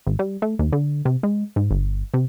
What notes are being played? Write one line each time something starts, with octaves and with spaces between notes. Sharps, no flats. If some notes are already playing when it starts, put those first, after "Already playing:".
G#1
G3
A3
D#2
D3
C3
G#3
G#2
G1
C3